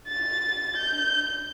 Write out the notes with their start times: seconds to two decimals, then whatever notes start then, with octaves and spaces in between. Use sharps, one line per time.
0.09 A6
0.77 G6